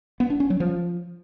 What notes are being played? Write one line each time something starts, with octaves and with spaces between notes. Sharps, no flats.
B3
D4
C#4
F#3
F3